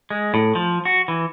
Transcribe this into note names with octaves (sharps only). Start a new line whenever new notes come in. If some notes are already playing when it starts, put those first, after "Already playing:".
G#3
A2
F3
F#4
E3